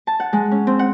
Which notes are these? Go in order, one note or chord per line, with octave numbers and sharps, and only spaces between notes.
A5
F#5
G#3
C#4
C4
F#5